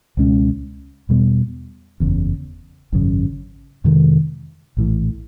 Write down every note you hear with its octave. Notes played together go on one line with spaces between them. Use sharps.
C#2 B2 G#3 C#4
E2 B2 G3 B3
F#1 E2 C#3
G#1 F#2 C#3
F2 C3 D#3 G#3
A#1 A2 E3